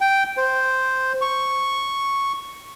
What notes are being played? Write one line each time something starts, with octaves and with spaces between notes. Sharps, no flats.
G5
C5
C#6